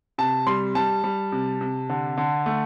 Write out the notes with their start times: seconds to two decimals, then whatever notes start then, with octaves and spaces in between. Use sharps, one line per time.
0.18 C3 A5
0.47 G3 C6
0.75 G3 A5
1.04 G3
1.32 C3
1.61 C3
1.89 D3
2.17 D3
2.46 A3